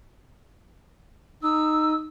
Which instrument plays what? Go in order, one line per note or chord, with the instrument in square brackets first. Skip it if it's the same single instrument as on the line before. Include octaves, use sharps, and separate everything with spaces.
[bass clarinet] D#4 [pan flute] E6